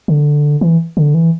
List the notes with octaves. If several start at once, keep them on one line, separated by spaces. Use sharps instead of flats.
D3
E3
D3
E3